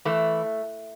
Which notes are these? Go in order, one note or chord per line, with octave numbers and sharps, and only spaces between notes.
E3 A3